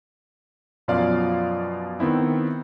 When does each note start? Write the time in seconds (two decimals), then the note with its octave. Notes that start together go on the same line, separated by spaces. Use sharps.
0.88 F#2 B2 F3 F4 D5 F5
2.00 D#3 B3 C4 E4